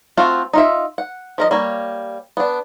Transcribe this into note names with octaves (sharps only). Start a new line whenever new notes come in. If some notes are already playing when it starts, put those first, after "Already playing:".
A3 C4 F4 F#4 C5
D#4 F4 E5
F#5
F3 A#4 D#5
G3 A#3 C#5
B3 D4